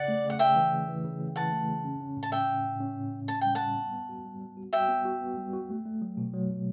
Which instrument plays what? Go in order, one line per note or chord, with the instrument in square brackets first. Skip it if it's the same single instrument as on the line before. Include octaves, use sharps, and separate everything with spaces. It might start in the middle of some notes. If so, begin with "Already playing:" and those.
Already playing: [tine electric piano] C#3 [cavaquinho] D5 F#5
[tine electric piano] A3
C#3
[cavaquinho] F#5
[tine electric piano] C#3 [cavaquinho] E5 G5
[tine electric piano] E3
C#3
E3
C#3
C#3
[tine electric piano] E3 [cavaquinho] F#5 A5
[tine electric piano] A3
C#3
C#4
C#4
A2
[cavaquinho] A5
[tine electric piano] C#4 [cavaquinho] E5 G5
[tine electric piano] A2
A2
C#4
A2
A2
[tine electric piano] C#4 [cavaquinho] A5
[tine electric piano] G3 [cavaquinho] G5
[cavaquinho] F#5 A5
[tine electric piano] G3
B3
B3
F#4
G3
G3
F#4
[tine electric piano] F#4 [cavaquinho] E5 G5
[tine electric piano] B3
F#4
B3
G3
F#4
A3
A3
F#3
B2
F#3
B2